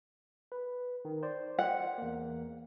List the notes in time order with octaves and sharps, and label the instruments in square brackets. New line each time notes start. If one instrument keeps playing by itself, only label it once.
[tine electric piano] B4
D#3
C5 D5
[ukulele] F#5
[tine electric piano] E2 A#3